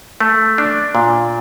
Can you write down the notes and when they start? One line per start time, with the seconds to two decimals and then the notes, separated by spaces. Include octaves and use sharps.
0.20 A3
0.58 D4
0.95 A#2